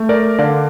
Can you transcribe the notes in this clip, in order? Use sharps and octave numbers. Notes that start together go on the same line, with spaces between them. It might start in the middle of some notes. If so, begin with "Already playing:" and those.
Already playing: A3
A#4 D5
D3 D5 F5